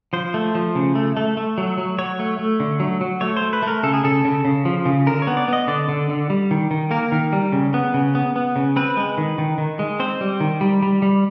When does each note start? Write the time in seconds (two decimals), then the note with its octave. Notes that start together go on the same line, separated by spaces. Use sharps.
0.13 F3 C5
0.34 A3
0.55 F3
0.75 C#3
0.95 A3
1.17 A3
1.37 A3
1.58 F#3
1.78 F#3
1.98 F#3 C#5
2.19 A3
2.39 A3
2.60 D3
2.80 F#3
3.01 F#3
3.21 A3 C#5
3.37 C5
3.42 A3
3.53 B4
3.63 A3 A#4
3.83 C#3 A4
3.94 G#4
4.04 C#3 A4
4.25 C#3
4.45 C#3
4.65 F3
4.86 C#3
5.07 D3 A#4
5.22 C#5
5.27 B3
5.37 D5
5.48 B3 D#5
5.67 D3 D5
5.89 D3
6.09 D3
6.30 G3
6.51 D#3
6.71 D#3
6.91 A#3 A#4
7.12 D#3
7.33 G3
7.52 C#3
7.74 B3
7.94 C#3
8.15 B3
8.36 B3
8.56 C#3
8.76 C4 B4
8.97 G#3
9.18 D#3
9.38 D#3
9.58 D#3
9.79 G#3
10.00 C4 C5
10.21 G3
10.40 D#3
10.61 G3
10.82 G3
11.02 G3